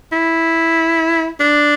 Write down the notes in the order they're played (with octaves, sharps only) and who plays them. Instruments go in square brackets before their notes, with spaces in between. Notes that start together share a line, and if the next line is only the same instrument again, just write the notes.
[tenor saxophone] E4
D4